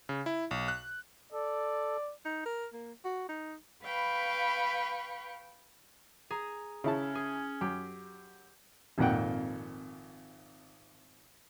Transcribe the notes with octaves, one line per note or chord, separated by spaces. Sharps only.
C#3
E4
B1
F#6
A4 D5
D#4
A#4
A#3
F#4
D#4
B4 F5 G5 B5 C#6
G#4 A#5
C#3 C#4 E4 A5
G#4
F#2 G4
G#1 F2 A#2 F#5 G5